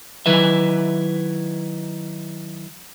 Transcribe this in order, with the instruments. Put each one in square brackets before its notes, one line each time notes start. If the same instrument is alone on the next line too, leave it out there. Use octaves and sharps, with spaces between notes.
[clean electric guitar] D#3 F#3 E4 B4 E5